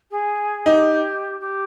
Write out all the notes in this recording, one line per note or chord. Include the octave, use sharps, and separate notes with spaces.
G#4
D#4 G4
G4